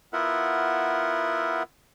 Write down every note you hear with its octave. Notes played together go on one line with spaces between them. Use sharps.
B3 E4 F4 A#4 E5 F#5